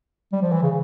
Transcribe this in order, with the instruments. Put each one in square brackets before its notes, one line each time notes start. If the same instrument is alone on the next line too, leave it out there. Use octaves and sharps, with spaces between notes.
[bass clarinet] G3
F3
E3
C#3